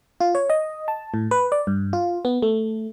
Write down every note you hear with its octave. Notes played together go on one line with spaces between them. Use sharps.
F4
C#5
D#5
A5
A2
B4
D5
G2
F4
B3
A3